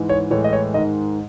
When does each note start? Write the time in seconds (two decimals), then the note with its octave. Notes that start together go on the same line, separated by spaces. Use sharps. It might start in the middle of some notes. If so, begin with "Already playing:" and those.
Already playing: G#2 E3 G#3
0.09 C#5
0.31 A2 E3 G#3 C#5
0.44 D#5
0.53 C#5
0.74 G#2 D#3 G#3 D#5